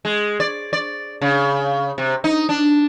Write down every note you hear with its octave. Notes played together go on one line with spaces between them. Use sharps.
G#3
D5
D5
C#3
C3
D#4
D4